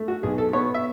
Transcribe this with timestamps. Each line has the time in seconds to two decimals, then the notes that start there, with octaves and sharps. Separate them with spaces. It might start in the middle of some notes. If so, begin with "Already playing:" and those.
Already playing: A3
0.08 F#4
0.23 B1 G#4
0.38 A4
0.53 B3 C#5
0.74 E5